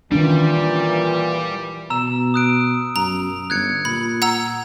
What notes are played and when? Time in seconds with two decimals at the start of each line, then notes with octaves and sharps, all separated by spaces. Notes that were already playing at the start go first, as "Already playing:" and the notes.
0.12 A#2 D#3 E3 G3 C#4 D4
1.90 B2 A#5 E6 E7
2.34 D#6 F#6 D7
2.96 F#2 A#5
3.50 G1 F#6 G#6 C#7
3.85 A#2 B5
4.22 F#5 A#5 E6